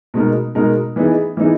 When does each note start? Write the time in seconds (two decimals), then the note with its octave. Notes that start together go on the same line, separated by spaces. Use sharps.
0.14 B2 G#3 D#4 A#4
0.55 B2 G#3 D#4 A#4
0.96 E3 B3 D#4 G#4
1.37 E3 B3 D#4 G#4